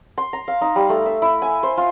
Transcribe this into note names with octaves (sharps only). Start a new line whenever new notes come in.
C6
A#5
F5
D#4
G3
A3
E5
E4
G#5
C5
F4